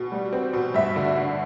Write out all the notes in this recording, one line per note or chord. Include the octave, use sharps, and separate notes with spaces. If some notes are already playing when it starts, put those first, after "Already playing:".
Already playing: B2
G3
C4
B2
G2 E5
D3
D3